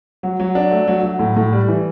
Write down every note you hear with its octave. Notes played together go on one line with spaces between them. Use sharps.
F#3
F#3
D4
A3
F#3
F#3
A2
A2
G3
E3